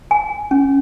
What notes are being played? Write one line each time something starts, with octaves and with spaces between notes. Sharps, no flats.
G#5
C#4